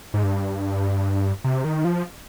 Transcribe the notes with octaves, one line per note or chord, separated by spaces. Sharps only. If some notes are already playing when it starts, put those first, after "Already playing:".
G#2
G2
C3
D#3
F3